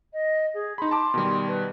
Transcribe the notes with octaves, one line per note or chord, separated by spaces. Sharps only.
D#5
G#4
D#4 B5 C6
A5 B5 D6
B2 D#3 G3
B4